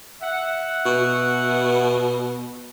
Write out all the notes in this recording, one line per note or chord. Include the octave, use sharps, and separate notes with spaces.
E5 F#5
B2